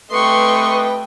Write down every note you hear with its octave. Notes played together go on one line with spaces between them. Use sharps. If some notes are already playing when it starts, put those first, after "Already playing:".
A3 C4 G4 B4 D#5 G5 C6 C#6